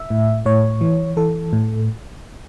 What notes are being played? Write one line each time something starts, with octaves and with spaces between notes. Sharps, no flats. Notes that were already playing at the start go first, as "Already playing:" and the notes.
Already playing: E5
A2
A2 C#5
E3
E3 A4
A2